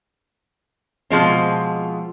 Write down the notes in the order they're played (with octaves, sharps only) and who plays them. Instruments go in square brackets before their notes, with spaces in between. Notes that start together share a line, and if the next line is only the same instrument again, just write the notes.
[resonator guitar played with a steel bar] B2 F3 G#3 C4